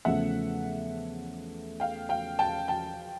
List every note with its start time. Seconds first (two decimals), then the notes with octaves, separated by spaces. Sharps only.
0.05 E2 C#3 F3 A3 E5 F#5
1.80 F5 G5
2.09 F5 G5
2.39 G5 A5
2.68 G5 A5